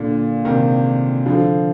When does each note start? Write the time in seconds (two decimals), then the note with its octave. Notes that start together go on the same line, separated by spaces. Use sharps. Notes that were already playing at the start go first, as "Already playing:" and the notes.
Already playing: A#2 D3
0.45 C3 D#3
1.26 D3 F3